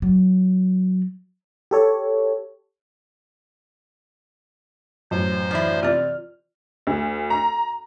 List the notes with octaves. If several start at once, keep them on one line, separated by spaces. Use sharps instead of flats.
F#3
G4 A4 C#5
A1 F#2 C5
E3 F3 D4 E4 B5
C3 C4 F4 D5 F6
D2
A#5